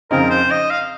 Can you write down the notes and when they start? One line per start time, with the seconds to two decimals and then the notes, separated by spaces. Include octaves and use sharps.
0.11 F2 C#3 F3 C4 D#4 A#4
0.30 C5
0.51 D#5
0.70 F5